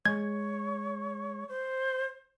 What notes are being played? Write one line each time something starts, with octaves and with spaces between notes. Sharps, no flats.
G#3 C#5 G#6
C5